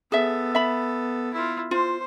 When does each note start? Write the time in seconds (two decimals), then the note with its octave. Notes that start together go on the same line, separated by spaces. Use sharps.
0.12 B3 G#4 A4 E5
0.55 E5 B5
1.33 E4 F4
1.71 F4 C5